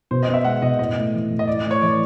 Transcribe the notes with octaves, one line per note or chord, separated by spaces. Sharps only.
B2 C5
D#5
B3
E5
G#3 F#5
B2 D#5
A2 D#5
A3
E3
A2
D#5
A2 D5
A3
C#5
E3 D5